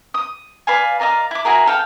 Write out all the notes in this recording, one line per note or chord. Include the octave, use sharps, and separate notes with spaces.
D#6
B4 D5 F5 G#5
A#4 D5 D#5 F5
E4 D6
E4 F#4 G#4 A#4
A4 F5 G5